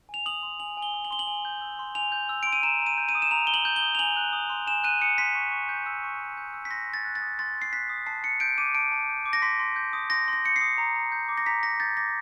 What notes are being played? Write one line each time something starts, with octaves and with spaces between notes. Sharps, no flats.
G#5 F7
D#6 F#7
C6
G#5 F#7
G#5
G7
D#6
F#7
C6 G7
F#7
G#5
G6
E6
C6
G#5 F7
G6
E6
C6 D7
D#7
A#5 E7
A#5
D#7
G6
D#7
D#6
E7
A#5 F7
A#5 G7
F#7
G6
G7
D#6
F7
G#5 F#7
F#6
D#6
C6
G#5 E7
F#6 D#7
D#6 C#7
C6 B6
C#6
C#6
G6
E6
C#6
C#6
G6
E6
B6
C6 A#6
C6
A6
F#6
A6
D#6
C6 A6
C6
C7
F#6 B6
D#6
A5 C7
A5 C#7
G6 D7
D6 D#7
A5 D7
A5
G6
D6
A#6
C6 B6
C6
G6
D#6
C6 A#6
C6
A#6
G6 C#7
C7
D#6
A#5
A#5
G6
D6
A#6
A#5 B6
A#5 A#6
G6 A6
D6 A#6